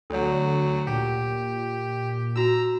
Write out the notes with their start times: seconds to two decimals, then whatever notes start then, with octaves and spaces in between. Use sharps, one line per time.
0.10 D2 D3 F#3 A4 C#5
0.87 A#2 G4
2.36 E4 F#4 A#5 E6